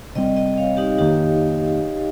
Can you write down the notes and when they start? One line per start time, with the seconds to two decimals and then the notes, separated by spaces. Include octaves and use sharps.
0.15 C3 G3 C4 D#5 G5
0.36 D#5 G5
0.57 C#5 F5
0.77 D#4 G4
0.98 F2 D#3 A#3 D#4 G4